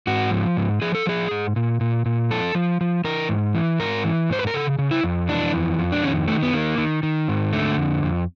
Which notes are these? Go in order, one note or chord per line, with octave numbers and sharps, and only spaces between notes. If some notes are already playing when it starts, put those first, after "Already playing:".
G#2 F#4
F3
G#2
F3 G#4
A4
F3 G#4
G#2
A#2
A#2
A#2
F3 A4
F3
F3
E3 A#4
G#2
E3
G#2 A#4
E3
G#2 C5
B4
A#4
C#3 A4
C#3
E4
F2
E3 D4
F2
F2
D4
D#3 C#4
D#3 A3
B3
D#3 A#3
D#3
D#3
G#2
D3 A3
F2
F2